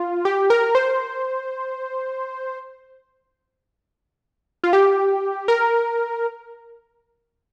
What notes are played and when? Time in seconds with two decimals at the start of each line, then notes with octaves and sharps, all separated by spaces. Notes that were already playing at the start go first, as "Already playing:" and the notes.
Already playing: F4
0.25 G4
0.50 A#4
0.75 C5
4.64 F4
4.73 G4
5.48 A#4